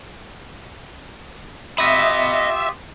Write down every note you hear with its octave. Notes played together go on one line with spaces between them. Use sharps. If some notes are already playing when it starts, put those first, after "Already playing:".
F4 G4 D#5 E5 B5 D#6 B6